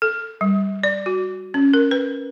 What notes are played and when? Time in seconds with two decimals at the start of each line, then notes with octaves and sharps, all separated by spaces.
0.02 A4
0.41 G3
0.84 D5
1.06 F#4
1.54 C#4
1.74 A#4
1.91 B4